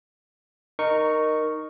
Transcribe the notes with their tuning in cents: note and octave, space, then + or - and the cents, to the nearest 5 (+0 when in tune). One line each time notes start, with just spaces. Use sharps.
D#4 -15 A#4 +0 C#6 +0